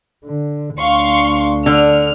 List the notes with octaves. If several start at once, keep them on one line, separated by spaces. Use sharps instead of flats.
D3
D2 D4 F5 C6 C#6
D3 F6